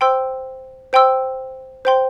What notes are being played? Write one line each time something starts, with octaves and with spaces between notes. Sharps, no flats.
C5 G5 C6 E6
C5 G5 C6 E6
C5 G5 C6